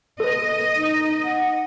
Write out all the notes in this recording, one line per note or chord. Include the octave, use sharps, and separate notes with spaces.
A4 B4 D#5
D#4
F#5